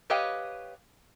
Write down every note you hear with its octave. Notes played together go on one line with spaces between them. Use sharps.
G4 B4 C#5 D#5 F5 G5